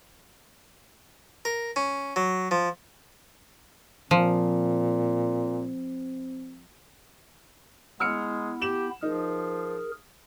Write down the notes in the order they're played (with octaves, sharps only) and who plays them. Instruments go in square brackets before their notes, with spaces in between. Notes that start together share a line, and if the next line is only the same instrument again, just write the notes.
[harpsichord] A#4
C#4
F#3
F3
[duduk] A#2 [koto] F3 [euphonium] C4
[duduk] G#3 [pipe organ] B3 E4 [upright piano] E6 F6 C#7
[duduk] G4 [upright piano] E7 F#7
[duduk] F3 [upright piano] D#4 [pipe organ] G#4 A#4